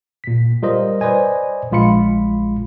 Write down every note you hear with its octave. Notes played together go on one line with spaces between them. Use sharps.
A#2 B6
G3 F4 A#4 C5 D#5
B4 C5 D5 D#5 G#5
A#1 G#3 F4 B5 C#7